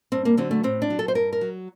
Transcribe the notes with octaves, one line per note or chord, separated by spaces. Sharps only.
G2 C4
A#3
D3 F#3 C4
A3
A2 C4
D4
F#3
A4
C5
G2 A#4
A#4
F#3